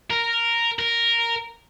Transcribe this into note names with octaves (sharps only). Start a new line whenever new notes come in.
A#4
A#4